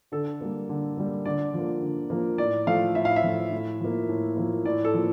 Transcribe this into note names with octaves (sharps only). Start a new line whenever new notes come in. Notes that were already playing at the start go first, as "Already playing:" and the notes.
D3 A4
G3 A#3
D3
G3 A#3
D3 D5
F3 A#3
D3
F3 A#3
A2 D5
F3 A3 F5
A2 E5
F5
E5
F3 A3
A2
F3 A#3
A2
F3 A#3
A2 D5
A4
F3 A#3